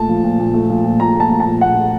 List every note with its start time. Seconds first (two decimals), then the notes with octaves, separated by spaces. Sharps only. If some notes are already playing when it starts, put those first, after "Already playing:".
Already playing: A#2 A3 A5
0.09 F3
0.24 A#2
0.39 A#2
0.54 A3
0.70 F3
0.84 A#2
1.00 A#2 A#5
1.15 A3 A5
1.30 F3
1.40 A5
1.46 A#2
1.61 A#2 F#5
1.76 A3